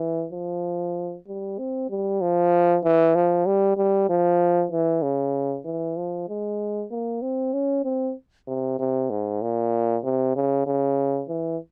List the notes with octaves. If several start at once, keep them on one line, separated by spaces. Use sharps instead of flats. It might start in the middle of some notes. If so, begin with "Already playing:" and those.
Already playing: E3
F3
G3
C4
G3
F3
E3
F3
G3
G3
F3
E3
C#3
E3
F3
G#3
A#3
C4
C#4
C4
C3
C3
G#2
A#2
C3
C#3
C#3
E3